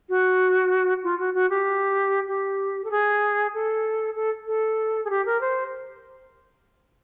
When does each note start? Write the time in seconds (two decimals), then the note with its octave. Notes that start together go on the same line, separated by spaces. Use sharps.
0.09 F#4
1.03 F4
1.19 F#4
1.34 F#4
1.50 G4
2.28 G4
2.84 A4
2.91 G#4
3.54 A4
4.16 A4
4.47 A4
5.05 G#4
5.10 G4
5.26 A#4
5.41 C5